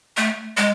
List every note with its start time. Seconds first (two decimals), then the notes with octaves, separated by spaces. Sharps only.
0.17 A3
0.57 G#3